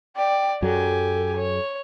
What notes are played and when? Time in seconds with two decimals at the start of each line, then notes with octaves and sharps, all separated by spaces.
0.16 D5 G5
0.62 F#2 F#3 G4 A4 G#5
1.36 C#5